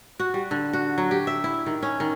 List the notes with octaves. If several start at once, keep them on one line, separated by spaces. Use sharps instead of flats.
F#4
G3
D3
F#4
F#3
G4
E5
E4
D#3
C#4
D#3